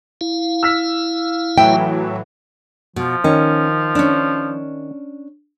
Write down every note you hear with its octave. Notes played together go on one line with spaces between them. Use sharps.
E4 F5
E6 F6 B6
A2 E3 F#3 E5 G5
B2 F3
D#3 C#4
C#4 D4